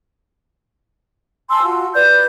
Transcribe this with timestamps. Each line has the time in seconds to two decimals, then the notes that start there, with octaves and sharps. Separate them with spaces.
1.50 G#5 A5 C6 E6
1.62 F4 F#4
1.94 B4 D5 G6